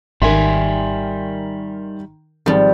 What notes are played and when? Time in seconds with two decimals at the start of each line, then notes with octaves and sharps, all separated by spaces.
0.22 G#1 D#3 G3 A#4 E5 G#5 C6
2.46 G#1 F3 G3